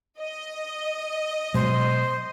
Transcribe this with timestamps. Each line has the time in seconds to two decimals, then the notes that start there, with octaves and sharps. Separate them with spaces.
0.20 D#5
1.54 B2 F#3 G#3 C5